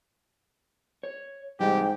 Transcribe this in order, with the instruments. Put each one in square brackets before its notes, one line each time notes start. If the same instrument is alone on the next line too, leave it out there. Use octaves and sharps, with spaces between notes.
[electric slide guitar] C#5
[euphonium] G#2 [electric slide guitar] C3 E3 G3 [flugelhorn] G4 [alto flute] G5